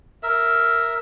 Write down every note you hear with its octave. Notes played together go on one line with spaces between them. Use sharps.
A#4 E5